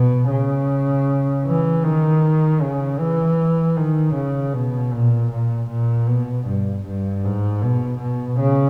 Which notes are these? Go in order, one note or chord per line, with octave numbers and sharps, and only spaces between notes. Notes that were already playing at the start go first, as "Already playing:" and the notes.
Already playing: B2
C#3
E3
D#3
C#3
E3
D#3
C#3
B2
A#2
A#2
A#2
B2
G2
G2
G#2
B2
B2
C#3